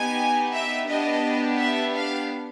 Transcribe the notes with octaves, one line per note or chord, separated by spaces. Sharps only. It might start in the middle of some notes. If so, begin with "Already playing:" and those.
Already playing: B3 D#4 G4 G#5
E5
B3 D4 G4 D#5
E5
F5